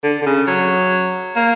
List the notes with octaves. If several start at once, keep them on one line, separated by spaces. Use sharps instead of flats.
D3
D3
C#3
F#3
A#3